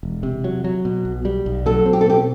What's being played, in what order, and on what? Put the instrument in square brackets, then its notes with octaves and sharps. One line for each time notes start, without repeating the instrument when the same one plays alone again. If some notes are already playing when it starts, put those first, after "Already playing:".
[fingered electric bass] E1
C3
F#3
F#3
B2
B1
G3
B1
[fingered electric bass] F#3 [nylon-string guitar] A4
[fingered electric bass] C4
[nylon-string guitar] G4
A4
[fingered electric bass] B2 [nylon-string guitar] G4